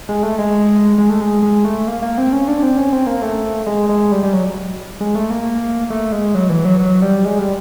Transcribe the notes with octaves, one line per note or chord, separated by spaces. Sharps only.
G#3
A3
G#3
G#3
A3
G#3
G#3
A3
A#3
A#3
C4
C#4
D4
C4
C#4
C4
A#3
A3
G#3
G#3
G3
G3
F#3
G#3
A3
A#3
A3
G#3
F#3
E3
F#3
F#3
G3
G#3
G3